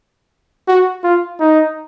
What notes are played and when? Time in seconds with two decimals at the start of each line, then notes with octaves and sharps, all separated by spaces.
0.68 F#4
1.04 F4
1.40 D#4